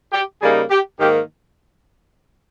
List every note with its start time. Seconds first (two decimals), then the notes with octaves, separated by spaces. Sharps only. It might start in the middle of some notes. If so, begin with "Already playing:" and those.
0.12 G4
0.41 C#3 G3 A#3 D#4 G#4
0.70 G4
0.99 G#2 D#3 A#3 G4